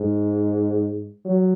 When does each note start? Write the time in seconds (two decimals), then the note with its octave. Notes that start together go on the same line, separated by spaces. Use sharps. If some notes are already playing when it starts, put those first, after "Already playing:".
Already playing: G#2
1.25 F#3